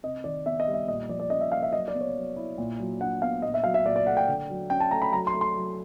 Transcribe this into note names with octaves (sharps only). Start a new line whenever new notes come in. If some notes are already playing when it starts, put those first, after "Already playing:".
C3 D#5
D#3 D5
B3 E5
D#5
G3
E5
A#2 D#5
F3 D5
D5
C#4 D#5
E5
A#3 F5
E5
F#3 D#5
D5
B3
C#5
F#3
E4
A#2
F#3
D4 F#5
B3 F5
A#2 D#5
E5
F#3 F5
E5
A#2 D5
D5
A3 F#5
G5
D3
F#3
C#4 G5
A5
A3 A#5
B5
F#3 A#5
C6
A3
C6
F#3